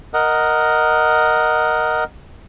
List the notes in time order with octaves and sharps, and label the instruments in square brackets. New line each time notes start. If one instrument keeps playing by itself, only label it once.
[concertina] A#4 D#5 F#5